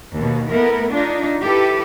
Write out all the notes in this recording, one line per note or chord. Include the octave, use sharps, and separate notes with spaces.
D#2 B2
A3 B3 E4 A#4
D4 D#4 F4
E4 G4 A4 B4